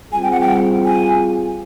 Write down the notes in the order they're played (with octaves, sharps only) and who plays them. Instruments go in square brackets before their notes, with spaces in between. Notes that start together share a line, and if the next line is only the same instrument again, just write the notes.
[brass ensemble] G3 C4 F4 G#4 [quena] G#5
[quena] G5
F#5
G5
G#5